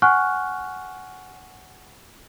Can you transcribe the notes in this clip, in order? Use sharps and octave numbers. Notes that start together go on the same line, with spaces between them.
F#5 G#5 C#6 F6 F#6